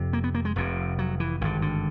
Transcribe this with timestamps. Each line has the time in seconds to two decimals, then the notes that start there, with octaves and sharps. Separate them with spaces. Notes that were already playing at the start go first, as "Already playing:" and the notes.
Already playing: F1 F2 C3
0.13 A#3
0.24 B3
0.35 A#3
0.45 G#3
0.56 F1 F2 C3
0.99 F#3
1.20 E3
1.41 G#1 G2 D3 D#3
1.62 D3